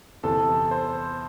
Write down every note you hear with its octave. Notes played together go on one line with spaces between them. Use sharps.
E2 C3 E3 A4
C5